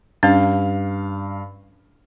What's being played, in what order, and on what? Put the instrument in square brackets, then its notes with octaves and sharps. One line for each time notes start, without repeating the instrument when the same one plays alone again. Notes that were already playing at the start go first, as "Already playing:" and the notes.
[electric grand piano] G2 F5 [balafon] C#4 D4